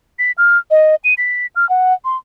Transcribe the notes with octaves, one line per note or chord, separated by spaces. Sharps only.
B6
F6
D#5
D#7
B6
F6
F#5
C6